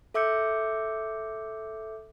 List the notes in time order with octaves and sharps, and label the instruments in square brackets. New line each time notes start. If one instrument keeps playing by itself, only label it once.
[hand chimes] A4 E5 D6 E6 G6 C#7